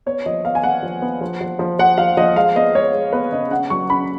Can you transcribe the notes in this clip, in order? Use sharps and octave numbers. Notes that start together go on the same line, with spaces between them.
B3 C#5
F3 D#5
B3 F5
G#5
B3 F#5
F3
B3
F3
F3
F3
F3 F#5
F3 F5
F3 D#5
G#3 F5
B3 D#5
G#3 C#5
G#3
B3 B4
C#3 D#5
C#4 F#5
F#3 C#6
C#4 B5